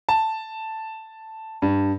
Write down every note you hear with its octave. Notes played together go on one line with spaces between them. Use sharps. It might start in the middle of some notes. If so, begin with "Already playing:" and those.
A5
G2